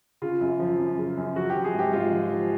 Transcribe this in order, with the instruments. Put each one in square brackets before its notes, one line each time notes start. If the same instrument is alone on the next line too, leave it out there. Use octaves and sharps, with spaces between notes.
[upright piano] C#3 F4
F#2
F3
F#2
C#3
F#2
F3 F#4
F3 G4
G#4
G#2 G4
G#2 F4
F3
F3